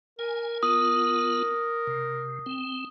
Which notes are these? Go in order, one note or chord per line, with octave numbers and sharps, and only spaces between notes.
A#4 G#5
B3 F4 D#6
C3
C4